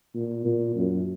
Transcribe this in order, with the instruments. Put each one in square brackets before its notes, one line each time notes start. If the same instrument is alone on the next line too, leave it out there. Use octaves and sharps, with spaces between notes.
[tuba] A#2
A#2
F#2